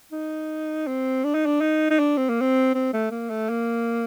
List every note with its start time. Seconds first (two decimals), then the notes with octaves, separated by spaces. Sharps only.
0.12 D#4
0.87 C4
1.24 D4
1.35 D#4
1.46 D4
1.61 D#4
1.90 D#4
1.99 D4
2.17 C4
2.29 A#3
2.41 C4
2.75 C4
2.93 A3
3.11 A#3
3.30 A3
3.49 A#3